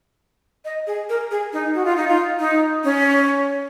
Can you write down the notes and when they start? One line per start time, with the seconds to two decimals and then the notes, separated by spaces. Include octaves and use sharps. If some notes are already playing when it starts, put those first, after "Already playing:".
0.65 D#5
0.87 G#4
1.09 A#4
1.31 G#4
1.53 D#4
1.75 F#4
1.85 F4
1.97 D#4
2.08 F4
2.40 D#4
2.84 C#4